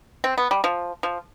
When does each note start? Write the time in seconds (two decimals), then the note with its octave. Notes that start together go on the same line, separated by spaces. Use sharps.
0.24 C4
0.38 B3
0.51 G3
0.64 F3
1.03 F3